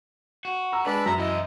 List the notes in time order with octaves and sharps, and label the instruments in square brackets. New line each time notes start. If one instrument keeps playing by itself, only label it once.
[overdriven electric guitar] F#4
[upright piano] A#5 E6
[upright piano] G#3 [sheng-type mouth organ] D4 B4 D5 [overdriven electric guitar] B5
[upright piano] F#2 [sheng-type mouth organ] E5 A#5
[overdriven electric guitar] E3 D#5 [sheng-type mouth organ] E4